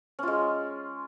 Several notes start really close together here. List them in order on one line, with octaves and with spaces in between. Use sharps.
C#4 F4 G#3